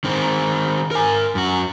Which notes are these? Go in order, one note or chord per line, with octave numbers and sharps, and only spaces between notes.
D#3 C4
A#4 G#5
F#2 F#4